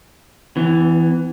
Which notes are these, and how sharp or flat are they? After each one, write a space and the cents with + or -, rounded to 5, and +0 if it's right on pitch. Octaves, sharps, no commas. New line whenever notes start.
E3 +0 B3 +40